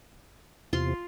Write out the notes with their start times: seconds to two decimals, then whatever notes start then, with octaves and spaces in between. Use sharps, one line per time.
0.73 E2 C3 F4 C6